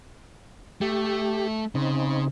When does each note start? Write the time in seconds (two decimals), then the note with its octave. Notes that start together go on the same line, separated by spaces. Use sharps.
0.81 A3 G4
1.75 C#3 C4 D#4